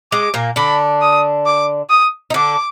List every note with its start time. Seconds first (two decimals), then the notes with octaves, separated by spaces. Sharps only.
0.12 G#3 D6
0.34 A#2 A#3
0.56 D3 D4 B5
1.01 D#6
1.46 D6
1.89 D#6
2.30 D#4
2.34 D3 D4 D6